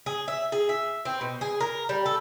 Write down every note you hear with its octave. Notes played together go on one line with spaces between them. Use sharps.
G#4
E5
G#4
E5
C4
B2
G#4
A#4
G3
A4